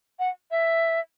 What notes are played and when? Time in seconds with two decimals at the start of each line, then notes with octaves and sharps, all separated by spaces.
0.19 F#5
0.51 E5